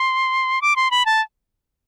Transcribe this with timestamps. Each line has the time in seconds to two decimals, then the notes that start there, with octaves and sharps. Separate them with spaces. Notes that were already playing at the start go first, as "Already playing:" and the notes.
Already playing: C6
0.62 D6
0.76 C6
0.91 B5
1.06 A5